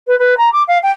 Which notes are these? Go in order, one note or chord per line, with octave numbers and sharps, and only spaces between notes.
B4
B4
A#5
D6
F5
G5